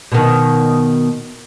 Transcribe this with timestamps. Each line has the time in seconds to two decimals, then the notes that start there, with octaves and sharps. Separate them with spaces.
0.12 B2 D#3